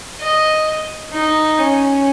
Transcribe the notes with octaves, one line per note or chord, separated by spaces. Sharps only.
D#5
D#4
C#4